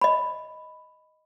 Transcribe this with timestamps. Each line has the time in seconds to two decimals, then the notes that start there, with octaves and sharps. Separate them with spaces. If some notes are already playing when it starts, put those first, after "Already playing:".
0.01 D#5 B5